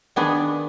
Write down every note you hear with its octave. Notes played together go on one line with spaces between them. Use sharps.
D#3 B3 D4 G#4